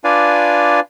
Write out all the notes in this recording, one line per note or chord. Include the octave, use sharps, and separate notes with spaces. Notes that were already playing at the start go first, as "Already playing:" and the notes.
D4 F4 B4 D5 F5 G#5